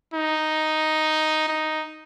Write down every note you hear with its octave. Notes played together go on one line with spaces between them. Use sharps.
D#4
D#4